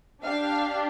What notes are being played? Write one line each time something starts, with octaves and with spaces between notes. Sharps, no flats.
D4 G4 F5